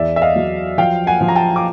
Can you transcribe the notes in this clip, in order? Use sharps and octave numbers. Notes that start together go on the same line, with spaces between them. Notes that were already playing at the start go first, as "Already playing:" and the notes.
Already playing: E2 D5 E5
E5
D#5 F5
F#3
F3 F5 G5
F#5 G#5
F3
A#5
G5 A5
D6